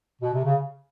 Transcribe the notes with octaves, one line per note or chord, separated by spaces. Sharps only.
B2
C3
C#3